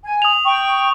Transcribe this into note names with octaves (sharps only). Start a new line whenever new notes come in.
G#5
D#6 F7
G5 C#6